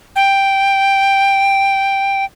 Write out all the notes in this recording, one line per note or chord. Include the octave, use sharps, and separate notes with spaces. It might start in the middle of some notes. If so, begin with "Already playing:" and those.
G5